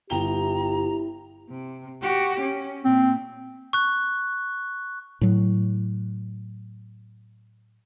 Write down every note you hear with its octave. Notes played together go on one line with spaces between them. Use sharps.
G1 E4 G4 G5 A#5 G7
C3
F#4 G4
C#4
A#2 C4
C#6 F#6
A2 F#3